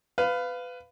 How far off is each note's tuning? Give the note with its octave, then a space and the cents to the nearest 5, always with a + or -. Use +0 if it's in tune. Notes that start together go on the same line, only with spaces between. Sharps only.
B4 +20 F5 +0